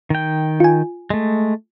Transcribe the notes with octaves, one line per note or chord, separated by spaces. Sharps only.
D#3 G5
F4 G#5
G#3 A3